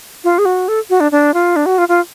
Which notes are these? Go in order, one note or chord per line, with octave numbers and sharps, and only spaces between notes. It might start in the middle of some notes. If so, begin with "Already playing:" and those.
F4
G#4
F#4
A4
F#4
D4
D4
F4
D4
F#4
F4
F4